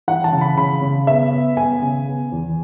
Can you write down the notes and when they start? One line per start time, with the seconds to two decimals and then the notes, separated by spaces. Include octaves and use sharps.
0.08 E3 F#5
0.24 A5
0.32 C#3
0.41 B5
0.57 C#3 B5
0.82 C#3
1.07 B3 E5
1.32 B3
1.57 B3 G#5
1.82 C#3
2.07 B3
2.32 E2